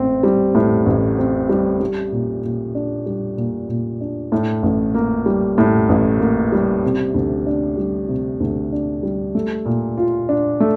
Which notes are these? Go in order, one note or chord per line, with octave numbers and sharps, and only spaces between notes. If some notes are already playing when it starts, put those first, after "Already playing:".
Already playing: A1 A2 C4
G3
A2
A1
C4
G3
G3
A#2
A#2
D4
G3
A#2
A#2
D4
A2
A1
A#3
G3
A2
A1
A#3
G3
C3
D2
D4
G3
C3
D2
D4
G3
A3
A#2
F4
D4
A3